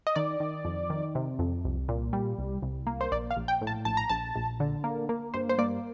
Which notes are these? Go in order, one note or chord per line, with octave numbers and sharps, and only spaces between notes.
D#5
D#3 D5
D#3
F2
D#3
C3
F2
C2
A#2
G3
C2
C2
A#3
C5
A#1 D5
F5
A#1
G5
A2
A5
A#1 A5
A#5
A#1 A5
A#1
D3
A#3
A#3
G2 C5
C5
A#3 D5